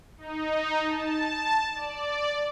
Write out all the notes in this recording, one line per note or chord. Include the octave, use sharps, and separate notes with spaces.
D#4
A5
D5